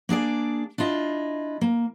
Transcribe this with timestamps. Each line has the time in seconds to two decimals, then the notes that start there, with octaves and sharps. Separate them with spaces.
0.09 A#3 D4 G#4 D5
0.78 D4 E4 F4 D#5
1.61 A#3